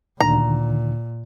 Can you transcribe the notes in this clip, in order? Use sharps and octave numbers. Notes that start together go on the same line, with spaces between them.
D2 A#2 D3 D#3 A#5